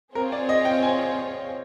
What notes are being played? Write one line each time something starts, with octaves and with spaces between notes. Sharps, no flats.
C4 F4 G#4 A#4 C#5
D5
D#5
G5
G#5